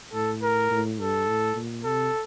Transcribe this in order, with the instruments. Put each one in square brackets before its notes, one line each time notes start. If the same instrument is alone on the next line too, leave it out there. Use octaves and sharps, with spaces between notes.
[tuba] A2 [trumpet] A4
[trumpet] A#4
[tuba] A2
[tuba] G2 [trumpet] A4
[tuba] A2
A#2
[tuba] C3 [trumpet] A4